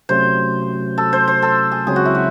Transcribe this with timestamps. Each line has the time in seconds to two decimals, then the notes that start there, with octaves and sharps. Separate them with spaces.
0.09 C3 F#3 A3 C#4 F#4 C5
0.98 A4
1.13 C5
1.28 C5
1.42 A4
1.72 G#4
1.87 C#2 C#3 F#3 C4 G#4
1.96 F#4
2.05 E4
2.15 F#4